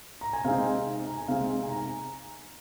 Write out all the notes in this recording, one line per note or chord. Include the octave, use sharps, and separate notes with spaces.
A#5
G#5
C3 G#3 C4 D#4 F5
A#5
G#5
C3 G#3 C4 D#4 F5
G#5
A#5